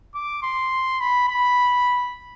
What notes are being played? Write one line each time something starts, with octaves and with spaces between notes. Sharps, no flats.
D6
C6
B5
B5